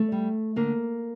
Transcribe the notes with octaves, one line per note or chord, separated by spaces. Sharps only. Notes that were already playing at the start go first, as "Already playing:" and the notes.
Already playing: A3
G3
D3 A#3